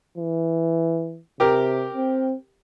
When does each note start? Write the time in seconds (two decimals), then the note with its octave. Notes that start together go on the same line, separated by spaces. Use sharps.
0.18 E3
1.40 C3 G4 A#4
1.94 C4